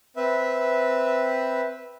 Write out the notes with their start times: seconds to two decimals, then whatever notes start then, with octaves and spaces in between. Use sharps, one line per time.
0.16 C4 B4 E5